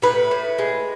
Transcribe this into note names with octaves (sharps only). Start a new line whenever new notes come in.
A2 B4
A2
G#3